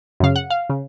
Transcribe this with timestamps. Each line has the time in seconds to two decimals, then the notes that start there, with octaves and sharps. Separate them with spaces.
0.20 F#2 C#3 F5
0.36 F#5
0.50 F5
0.70 C#3